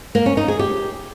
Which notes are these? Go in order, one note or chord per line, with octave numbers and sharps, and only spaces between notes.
A#3
C#4
D#4
G#4
G4